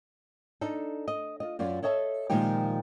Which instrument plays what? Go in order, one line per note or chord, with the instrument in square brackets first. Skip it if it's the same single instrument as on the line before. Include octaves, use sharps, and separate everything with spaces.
[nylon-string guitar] D4 D#4 A4
D#5
F4 D#5
F#2 F4 D5
A4 C#5 D#5 E5 A5
A#2 D#3 F3 G#3 D#4 G4